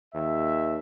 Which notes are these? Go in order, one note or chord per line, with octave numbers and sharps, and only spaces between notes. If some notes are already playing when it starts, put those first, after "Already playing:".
D#2 E5